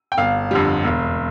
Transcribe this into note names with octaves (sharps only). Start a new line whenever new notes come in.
G5
G1 F5
F2 D3 G3
E1